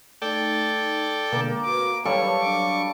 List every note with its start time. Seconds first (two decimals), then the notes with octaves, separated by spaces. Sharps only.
0.22 A3 D#4 A4 D5 G5 G#6
1.32 B2 D3 G#3 A#3
1.66 F#4 A#4 B4 D6
2.05 F#3 G3 A4 B4 C#5 F5 C#6
2.42 F#3 D4 D6